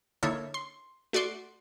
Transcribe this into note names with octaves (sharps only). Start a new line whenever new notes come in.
D3 A#3 D#4 E4 A4 C#5
C6
A3 F#4 D5 C6 D6